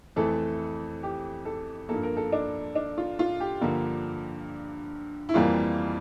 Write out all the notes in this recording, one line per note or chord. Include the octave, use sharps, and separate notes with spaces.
F2 E3 A3 A4
G4
A4
G2 F3 A#3 A4
A#4
A4
D4
D4
F4
F4
G4
G2 D3 F3 A#3
E4
F2 E3 G3 A#3 F4